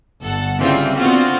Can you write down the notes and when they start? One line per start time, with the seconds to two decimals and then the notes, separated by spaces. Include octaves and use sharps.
0.21 G1 A4 F#5 A5
0.58 C#3 E3 G3 C4 F4
0.96 D3 B3 C4 F4 F#4